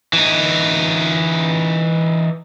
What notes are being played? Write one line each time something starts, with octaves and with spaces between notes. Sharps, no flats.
E3 D#4